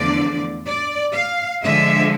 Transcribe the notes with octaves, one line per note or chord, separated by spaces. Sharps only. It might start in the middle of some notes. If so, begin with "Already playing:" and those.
Already playing: E2 D3 F3 A3 D5
D5
F5
D3 F3 G#3 E5